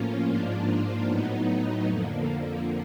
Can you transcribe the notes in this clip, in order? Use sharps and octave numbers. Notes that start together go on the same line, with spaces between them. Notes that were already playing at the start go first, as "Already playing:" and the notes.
Already playing: A2 F3 A#3 C#4 F4
G#2 F3 A#3 D4 F4
A2 F#3 B3 D#4
F2 D3 F3 A#3